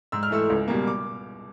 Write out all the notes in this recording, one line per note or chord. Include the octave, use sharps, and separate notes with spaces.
G#2 E6
F6
E3 A3 E6
C#2
B2 G3 A#3
D6